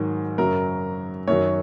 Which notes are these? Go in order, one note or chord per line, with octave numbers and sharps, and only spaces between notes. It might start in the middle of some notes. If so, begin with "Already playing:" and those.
Already playing: G#2 D#3 F#3
F#2 C#3 F#3 A#4
F#2 D#3 F#3 C#5